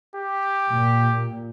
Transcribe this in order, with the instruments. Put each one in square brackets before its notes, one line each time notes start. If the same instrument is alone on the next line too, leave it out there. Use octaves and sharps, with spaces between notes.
[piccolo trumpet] G4
[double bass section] A#2